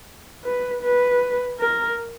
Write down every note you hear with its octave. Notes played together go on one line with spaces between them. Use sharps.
B4
B4
A#4